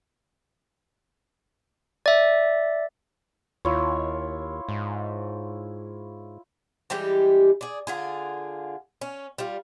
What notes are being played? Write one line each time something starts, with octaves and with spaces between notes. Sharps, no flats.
D5 E5
D#2 E4 F4 C#5
G#2
E3 G3 G#3 G4
G#4 D5
D3 F4 G#4
C#4
G3 F4